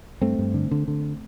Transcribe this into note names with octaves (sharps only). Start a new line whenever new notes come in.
G2 A3 C4
G2
D3
D3
D3